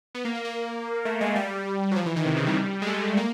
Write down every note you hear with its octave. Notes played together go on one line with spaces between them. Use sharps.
B3
A#3
A#3
A#3
A3
G#3
G3
F#3
F3
E3
D#3
C3
C#3
G3
G#3
A3
A#3